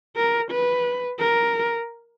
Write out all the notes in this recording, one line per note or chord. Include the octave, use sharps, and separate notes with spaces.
A#4
B4
A#4